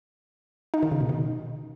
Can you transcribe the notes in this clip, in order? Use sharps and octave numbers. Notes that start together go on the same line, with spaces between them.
D#4
D#3
C#3
B2
D#3